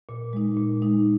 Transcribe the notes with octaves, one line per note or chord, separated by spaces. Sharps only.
A#2
G#3 D#4
A#2
G#3 D#4